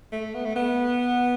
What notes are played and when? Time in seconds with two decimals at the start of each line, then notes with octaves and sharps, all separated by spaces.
0.12 A3
0.34 B3
0.45 A3
0.55 B3